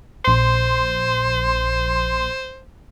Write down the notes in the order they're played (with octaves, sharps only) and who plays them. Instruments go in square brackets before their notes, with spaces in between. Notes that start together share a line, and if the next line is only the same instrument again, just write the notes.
[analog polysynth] A#1 C6 [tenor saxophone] C5